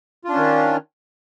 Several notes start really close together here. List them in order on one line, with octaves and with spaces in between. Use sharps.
F4 D4 C#4 D#3